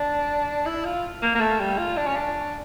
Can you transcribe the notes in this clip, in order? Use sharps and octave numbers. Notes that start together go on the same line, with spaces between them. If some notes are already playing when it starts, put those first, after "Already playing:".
Already playing: D4
E4
F4
A#3
A#3
A3
G3
F4
D4
C#4
D4